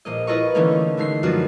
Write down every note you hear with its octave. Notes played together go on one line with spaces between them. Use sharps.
A#1 A#3 D#5
E4 F4 B4 D#5 A#5 C#6
D3 E3 A3 A#3 C#4 D#4
D3 G#3 A3 D#4 C7
F#2 F3 B3 D4 F4 F#4